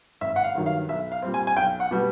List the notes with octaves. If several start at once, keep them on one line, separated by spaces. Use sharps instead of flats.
G#1 E5
F#5
F5
G2 D#3 F#3
F5
B1 E5
F5
A#2 G3 C4
G#5
G#5
B1 G5
F#5
B2 G3 B3